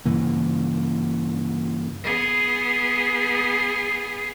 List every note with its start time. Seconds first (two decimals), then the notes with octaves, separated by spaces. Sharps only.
0.05 G2 C#3 E3 A#3
2.04 B3 G#4